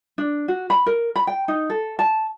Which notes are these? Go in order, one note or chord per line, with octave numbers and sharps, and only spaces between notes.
D4
F#4
B5
A#4
B5
G5
D#4
A4
A5